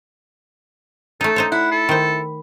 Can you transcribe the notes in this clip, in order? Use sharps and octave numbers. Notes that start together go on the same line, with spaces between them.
A3 D#4 A4
D#4 C5 C#5
E4 F#5
A4
D#3 C5